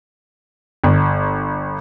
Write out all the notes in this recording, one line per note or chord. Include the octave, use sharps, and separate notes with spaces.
G1